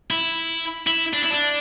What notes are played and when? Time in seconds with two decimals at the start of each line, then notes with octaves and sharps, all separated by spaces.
0.11 E4
0.87 E4
1.13 D4
1.22 E4
1.31 D4